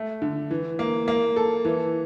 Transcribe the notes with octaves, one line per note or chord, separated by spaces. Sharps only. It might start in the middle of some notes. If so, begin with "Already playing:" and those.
Already playing: A3
D3
E3
A#3
A#3
A4
E3